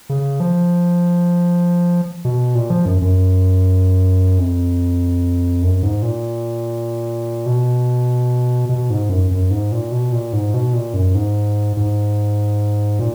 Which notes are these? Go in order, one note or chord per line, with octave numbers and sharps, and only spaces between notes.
C#3
F3
B2
A#2
F3
F#2
F#2
F2
F#2
G#2
A#2
B2
B2
G#2
F#2
F#2
G#2
A#2
B2
A#2
G#2
B2
A#2
F#2
G#2
G#2
A#2